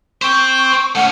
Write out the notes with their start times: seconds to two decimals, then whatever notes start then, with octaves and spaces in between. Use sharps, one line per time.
0.22 C5 G5 C#6
0.95 A3 C#4 F#5